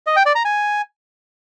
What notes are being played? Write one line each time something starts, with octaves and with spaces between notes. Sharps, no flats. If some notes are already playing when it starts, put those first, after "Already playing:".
D#5
G5
D5
A#5
G#5